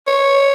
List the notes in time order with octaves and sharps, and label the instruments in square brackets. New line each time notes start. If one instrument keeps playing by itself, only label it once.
[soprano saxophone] C#5